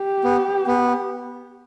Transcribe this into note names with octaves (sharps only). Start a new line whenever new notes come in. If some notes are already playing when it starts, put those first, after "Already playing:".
Already playing: G4
B3
B3